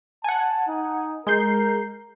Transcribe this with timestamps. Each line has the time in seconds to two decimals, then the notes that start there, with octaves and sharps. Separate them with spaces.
0.24 F#5 G#5 A5
0.68 D#4
1.27 G#3 A#4 G6 C7